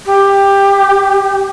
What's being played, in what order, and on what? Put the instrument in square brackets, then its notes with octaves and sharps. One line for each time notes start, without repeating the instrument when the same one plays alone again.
[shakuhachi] G4